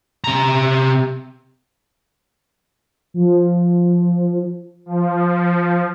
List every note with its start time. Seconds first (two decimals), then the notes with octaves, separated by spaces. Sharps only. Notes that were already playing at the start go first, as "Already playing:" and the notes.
0.24 C3 A#5
3.14 F3
4.86 F3